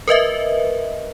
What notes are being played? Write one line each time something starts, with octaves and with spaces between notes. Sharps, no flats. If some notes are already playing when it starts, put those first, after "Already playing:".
A#4 B4 D#5 E5